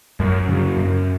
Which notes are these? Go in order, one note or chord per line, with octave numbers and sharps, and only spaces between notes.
F#2
C#3 F#3
F#2